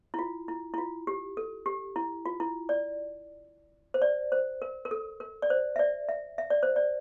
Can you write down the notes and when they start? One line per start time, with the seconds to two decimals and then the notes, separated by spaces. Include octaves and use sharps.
0.14 E4
0.19 F4
0.48 E4
0.74 E4
0.78 F4
1.07 G4
1.37 A4
1.66 G4
1.96 E4
2.26 F4
2.40 E4
2.69 D5
3.94 C5
4.02 D5
4.32 C5
4.62 A#4
4.85 A#4
4.91 A4
5.20 A#4
5.42 D5
5.50 C5
5.76 E5
5.79 D5
6.09 E5
6.38 E5
6.50 D5
6.63 C5
6.76 D5